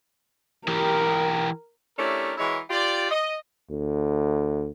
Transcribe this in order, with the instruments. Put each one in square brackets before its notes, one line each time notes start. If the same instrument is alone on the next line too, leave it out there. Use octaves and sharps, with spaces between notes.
[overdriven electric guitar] E3 G4 [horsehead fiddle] A#4
[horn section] A3 C#4 D4 E4 G4 A#4
E3 G#3 E4 F#4 A#4 C#5
F4 G4 D5
D#5
[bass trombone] D2